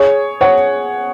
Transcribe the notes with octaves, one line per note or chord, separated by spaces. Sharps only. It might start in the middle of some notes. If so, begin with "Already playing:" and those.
Already playing: G#4 C#5
C#5 F#5